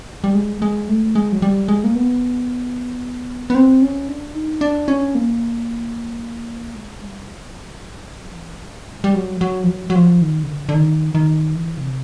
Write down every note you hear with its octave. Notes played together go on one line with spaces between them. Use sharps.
G3
G#3
G#3
A3
G#3
F#3
G3
G#3
A#3
B3
B3
C4
C#4
D4
D#4
D4
C#4
A#3
G#3
G3
F#3
F3
E3
F#3
G3
G3
F#3
F#3
F3
F#3
F#3
F3
D#3
C#3
D3
D3
D#3
D#3
E3
C#3
C3